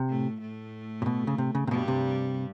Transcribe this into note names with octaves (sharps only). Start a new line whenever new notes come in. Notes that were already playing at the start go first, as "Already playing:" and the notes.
Already playing: C3
A2 A3
A2 A3
A#2
B2
C#3
C3
C#3
C3
G2 B2 G3
C3